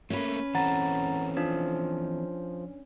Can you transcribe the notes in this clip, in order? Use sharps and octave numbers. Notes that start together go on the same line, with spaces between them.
A3 A#3 C#4 B4
E3 C4 A4 F#5 A#5 A6
F3 D4